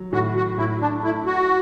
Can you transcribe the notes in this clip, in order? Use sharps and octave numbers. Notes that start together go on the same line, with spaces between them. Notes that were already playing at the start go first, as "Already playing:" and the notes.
Already playing: F#3
A2 F#4
F#4
A2 E4
D4
A3 E4
F#4